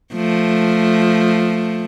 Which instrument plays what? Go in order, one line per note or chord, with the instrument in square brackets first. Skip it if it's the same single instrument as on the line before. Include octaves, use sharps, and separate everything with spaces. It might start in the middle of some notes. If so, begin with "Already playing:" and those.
[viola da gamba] F3 A3